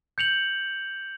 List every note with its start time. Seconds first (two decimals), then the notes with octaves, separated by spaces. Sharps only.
0.18 G6 C#7 F7 F#7